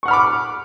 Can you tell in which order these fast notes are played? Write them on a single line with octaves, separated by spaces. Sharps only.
C#6 F#5 F6 B5 D6